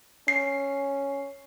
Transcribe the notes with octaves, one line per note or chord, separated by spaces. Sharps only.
C#4 C7